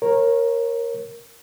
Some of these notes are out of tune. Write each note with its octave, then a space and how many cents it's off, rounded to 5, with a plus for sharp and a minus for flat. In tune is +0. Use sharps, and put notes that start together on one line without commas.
A#4 +0 C#5 -25